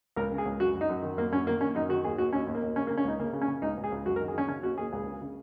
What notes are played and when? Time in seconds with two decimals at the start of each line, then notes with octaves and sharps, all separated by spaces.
0.16 C#2 A#4
0.32 C#3
0.38 G#4
0.45 C#2
0.60 F#2 F#4
0.74 F#2
0.81 D#4
0.89 F#2
1.03 D#3
1.17 F#2 A#3
1.31 F#2 C#4
1.47 D#3 A#3
1.60 D#3 C#4
1.75 F#2 D#4
1.89 D#3 F#4
2.04 D#2 G#4
2.18 D#2 F#4
2.33 D#2 C#4
2.47 D#2
2.55 A#3
2.62 D#2
2.76 C#3 C#4
2.87 A#3
2.91 C#3
2.97 C#4
3.04 C#2 D#4
3.19 C#3 A#3
3.33 C#3
3.41 C#4
3.48 C#3
3.62 C#2 D#4
3.77 C#2
3.84 G#4
3.92 C#2
4.06 F#2 F#4
4.16 A#4
4.21 D#3
4.28 G#4
4.34 D#3 C#4
4.49 C#3 C#4
4.63 D#2 F#4
4.78 D#2 G#4
4.93 C#2 G#4
5.07 C#3
5.22 C#3